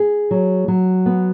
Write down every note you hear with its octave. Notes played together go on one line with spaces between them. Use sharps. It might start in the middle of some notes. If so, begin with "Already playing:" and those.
Already playing: G#4
F#3
F#3
B3